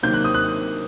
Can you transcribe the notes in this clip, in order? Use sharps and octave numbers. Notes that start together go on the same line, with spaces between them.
C3 D#3 F#3 A#3 G6
F#6
D#6
F#6